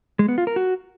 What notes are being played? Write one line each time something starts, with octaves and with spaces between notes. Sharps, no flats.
G#3
B3
F4
A#4
F#4